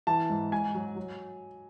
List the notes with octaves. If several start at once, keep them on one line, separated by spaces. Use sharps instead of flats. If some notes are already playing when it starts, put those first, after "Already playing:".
E3 A5
G#2
G#2 G#5
F#3
F#3